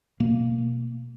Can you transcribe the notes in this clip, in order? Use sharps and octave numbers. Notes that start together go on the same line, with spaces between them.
B2 A#3